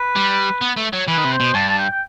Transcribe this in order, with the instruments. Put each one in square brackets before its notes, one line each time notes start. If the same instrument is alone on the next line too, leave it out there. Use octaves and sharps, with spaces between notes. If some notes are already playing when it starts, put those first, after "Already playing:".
Already playing: [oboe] B4
[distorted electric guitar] G3
B3
A3
F#3
[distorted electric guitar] E3 [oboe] B4
[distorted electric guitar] D#3
C3
[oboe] C5
[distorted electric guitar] B2
[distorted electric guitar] G2 [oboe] A5
[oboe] A5
G5
G5